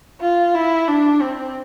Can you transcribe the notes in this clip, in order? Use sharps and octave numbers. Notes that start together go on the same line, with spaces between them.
F4
E4
D4
C4